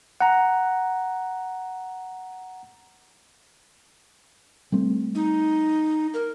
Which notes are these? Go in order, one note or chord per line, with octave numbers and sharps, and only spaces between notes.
F#5 A#5
G3 A3 C4
D#4
A#4